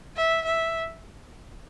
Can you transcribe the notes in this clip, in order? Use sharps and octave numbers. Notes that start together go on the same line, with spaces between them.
E5
E5